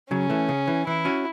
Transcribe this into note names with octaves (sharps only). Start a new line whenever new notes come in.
C#3 F#3 C#4
E3 A3
C#3
E3
E3 E4
C#4 F#4